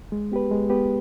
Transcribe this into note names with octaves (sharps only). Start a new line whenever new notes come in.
G#3
B3 G4 B4
G#3
B3 G4 B4